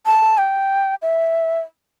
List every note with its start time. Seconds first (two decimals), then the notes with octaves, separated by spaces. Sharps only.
0.06 A5
0.38 G5
1.02 E5